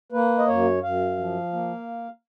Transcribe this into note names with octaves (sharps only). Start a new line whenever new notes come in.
A#3 B4
D#5
F#2 C#5
F#2 F5
F3
A#3